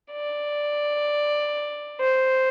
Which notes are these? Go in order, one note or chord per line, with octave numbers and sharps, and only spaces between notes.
D5
C5